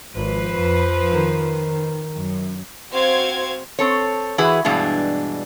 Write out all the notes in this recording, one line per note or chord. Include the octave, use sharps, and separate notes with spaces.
G#1 F3 B4 C5
F2
D#3
F#2
C4 F#4 C5 F5 G#6
C4 A4 C#5
E3 E4 F#4 G#4 B4
G2 B2 E3 G#3 D4